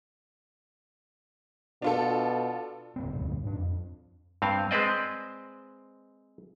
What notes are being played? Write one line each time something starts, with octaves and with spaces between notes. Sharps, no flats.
B2 D4 F4 A4
D#1 D2 C4
E1 D2 G2 D3
G2 D4
F2
G2 C4 F5
G#3 C4 B4 C5 D5 D#5